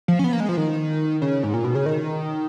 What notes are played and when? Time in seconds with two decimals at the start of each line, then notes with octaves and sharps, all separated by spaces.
0.08 F3
0.19 C#4
0.24 B3
0.33 A#3
0.40 G#3
0.49 F3
0.57 D#3
1.22 C#3
1.43 G#2
1.54 A#2
1.64 B2
1.75 C#3
1.86 D#3